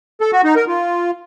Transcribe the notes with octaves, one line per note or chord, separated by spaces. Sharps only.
A4
F#4
D#4
A#4
F4